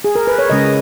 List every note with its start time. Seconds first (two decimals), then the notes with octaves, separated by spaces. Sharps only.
0.04 G#4
0.15 A#4
0.27 B4
0.38 C#5
0.50 C#3 G#3 C#4 D#5